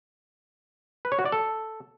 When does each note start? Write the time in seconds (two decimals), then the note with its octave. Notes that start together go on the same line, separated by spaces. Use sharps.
1.05 B4
1.12 C#5
1.19 F#4
1.25 D5
1.32 A4